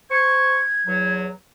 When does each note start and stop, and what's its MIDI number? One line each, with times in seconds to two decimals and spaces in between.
0.11 0.58 72
0.11 0.58 85
0.11 1.14 92
0.86 1.28 40
0.86 1.28 54